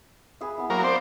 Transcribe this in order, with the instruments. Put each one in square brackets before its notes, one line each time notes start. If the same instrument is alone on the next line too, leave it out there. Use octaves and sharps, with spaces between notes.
[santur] G#4 B4 E5
B3 E4
[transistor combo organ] F#3 A#3 A#4 [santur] C#5 F5
[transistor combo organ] C4 C5 D5